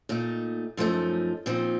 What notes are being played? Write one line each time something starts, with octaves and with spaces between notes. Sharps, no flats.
A#2 A3 D#4
F#2 F3 A3 D#4
A#2 F3 C4 D#4